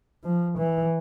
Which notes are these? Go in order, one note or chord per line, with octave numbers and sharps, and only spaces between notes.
F3
E3